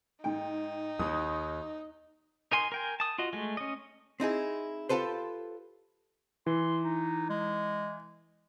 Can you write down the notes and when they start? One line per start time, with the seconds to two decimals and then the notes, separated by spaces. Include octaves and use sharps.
0.24 G#2 D#4 G5
0.99 D#2 D#6
2.52 D#4 A#4 G#5 C6
2.72 A#4 G5 G#5
3.00 A5 D#6
3.18 F4 F#4 D#5
3.33 G#3 A3
3.57 C#4 D#5
4.20 C4 D#4 E4 G#4
4.89 F4 G4 A4 B4 C5
6.46 E3 C6
6.82 D#4
7.30 G#3